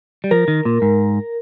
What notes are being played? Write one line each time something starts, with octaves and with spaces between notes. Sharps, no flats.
G3
F3 A#4
D#3
A#2
G#2